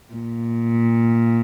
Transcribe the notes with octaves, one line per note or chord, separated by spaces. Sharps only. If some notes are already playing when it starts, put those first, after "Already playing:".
A#2